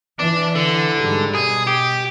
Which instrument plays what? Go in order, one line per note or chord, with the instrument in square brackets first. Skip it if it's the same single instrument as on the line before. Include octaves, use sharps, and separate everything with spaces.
[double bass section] E3 [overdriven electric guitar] D4
[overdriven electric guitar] D3
[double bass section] G#2 G3
[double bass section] B2 [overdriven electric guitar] G#4
[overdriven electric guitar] G4